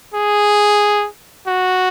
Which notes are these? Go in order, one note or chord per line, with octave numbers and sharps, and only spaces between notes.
G#4
F#4